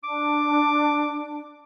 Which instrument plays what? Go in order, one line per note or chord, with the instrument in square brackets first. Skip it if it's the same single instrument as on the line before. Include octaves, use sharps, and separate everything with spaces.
[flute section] D4 [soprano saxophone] D6